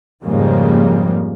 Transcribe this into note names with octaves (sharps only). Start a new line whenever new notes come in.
F2 G#2 C#3 F3 G3 A#3